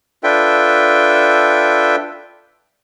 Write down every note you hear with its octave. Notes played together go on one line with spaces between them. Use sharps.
D4 F4 A4 B4 E5 G5